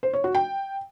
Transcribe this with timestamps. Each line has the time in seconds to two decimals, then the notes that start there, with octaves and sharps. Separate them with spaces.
0.03 C5
0.13 C#5
0.24 F#4
0.35 G5